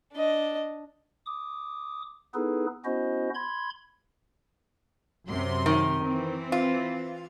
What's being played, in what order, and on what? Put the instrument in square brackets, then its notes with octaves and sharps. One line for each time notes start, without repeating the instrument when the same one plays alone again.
[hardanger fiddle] D4 D#5
[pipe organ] D6 D#6
B3 D#4 E4 G#4 A4 B4
B3 C#4 E4 F#4 C5 D#5
B5 C6 G#6
[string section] F#2 C3 C6
[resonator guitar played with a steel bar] D#3
[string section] E3 C4
[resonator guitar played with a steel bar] F4